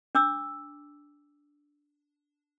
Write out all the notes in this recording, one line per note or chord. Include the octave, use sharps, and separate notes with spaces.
D4 D6 E6